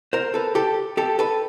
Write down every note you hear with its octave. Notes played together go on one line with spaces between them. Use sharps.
A#4 C5
A4 B4
G4 A4
G4 A4
A4 B4